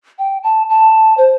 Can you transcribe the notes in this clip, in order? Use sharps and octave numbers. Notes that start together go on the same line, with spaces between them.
G5
A5
A5
C5